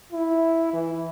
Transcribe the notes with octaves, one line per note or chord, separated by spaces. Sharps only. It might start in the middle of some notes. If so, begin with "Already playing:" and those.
E4
E3